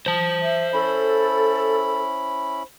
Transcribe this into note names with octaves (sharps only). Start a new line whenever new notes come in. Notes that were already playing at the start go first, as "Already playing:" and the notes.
C5 A5
E5
C#4 E4 A4 B5